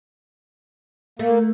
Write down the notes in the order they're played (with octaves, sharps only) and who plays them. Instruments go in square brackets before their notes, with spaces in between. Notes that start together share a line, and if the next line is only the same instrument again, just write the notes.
[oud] A3 [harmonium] A#3